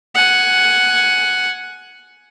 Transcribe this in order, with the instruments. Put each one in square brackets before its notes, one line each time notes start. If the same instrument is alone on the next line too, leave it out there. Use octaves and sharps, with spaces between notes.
[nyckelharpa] F#5 G#5